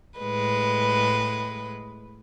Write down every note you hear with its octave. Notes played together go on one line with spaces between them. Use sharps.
A2 G#3 B4